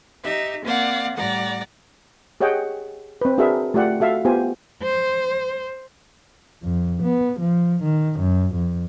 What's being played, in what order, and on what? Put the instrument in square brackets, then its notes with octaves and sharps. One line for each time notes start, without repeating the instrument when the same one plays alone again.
[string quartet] D#4 G4 E5
A#3 C4 D5 F5 F#5
A2 G3 D5 F#5 A#5
[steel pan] G4 G#4 C#5 D#5 F#5 G5
C4 B4
D4 F#4 G#4 A#4 B4 E5
A3 F4 G4 D5 F#5
F#4 A4 E5 F5
B3 F4 G4 C5 G#5
[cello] C5
[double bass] F2
B3
F3
D#3
F#2
F2